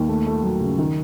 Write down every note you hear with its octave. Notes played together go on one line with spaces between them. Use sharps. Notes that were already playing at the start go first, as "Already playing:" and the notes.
Already playing: D#2
A3
A3
F#3
C#3
D#3